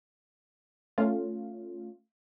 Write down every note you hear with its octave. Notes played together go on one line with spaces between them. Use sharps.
A3 C#4 F4